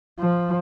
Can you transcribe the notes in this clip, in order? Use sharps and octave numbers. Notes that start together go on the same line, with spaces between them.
F3